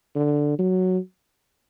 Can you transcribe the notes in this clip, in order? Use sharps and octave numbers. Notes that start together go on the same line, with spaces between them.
D3
F#3